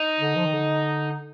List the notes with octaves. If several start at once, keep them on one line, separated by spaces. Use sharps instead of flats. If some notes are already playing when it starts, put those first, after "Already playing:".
Already playing: D#4
D3
F3
D#3
D3